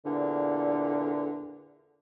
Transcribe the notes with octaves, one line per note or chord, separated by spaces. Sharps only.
E2 A#2 D3